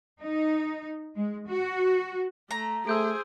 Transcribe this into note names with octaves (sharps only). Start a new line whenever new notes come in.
D#4
G#3
F#4
A3 A#5
A3 G#4 C5 E6 G6 D7